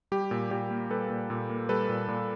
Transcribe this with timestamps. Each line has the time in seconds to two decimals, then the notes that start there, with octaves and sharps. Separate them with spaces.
0.12 G3 G4
0.31 A#2
0.51 A#2 G4
0.71 A#3
0.90 G3 A4 B4
1.10 A#2
1.30 A#2
1.50 A#3
1.69 G3 A4 B4
1.89 A#2
2.08 A#2